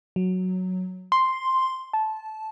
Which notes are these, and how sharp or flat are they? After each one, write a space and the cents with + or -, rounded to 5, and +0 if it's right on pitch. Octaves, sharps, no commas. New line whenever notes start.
F#3 -5
C6 +0
A5 -15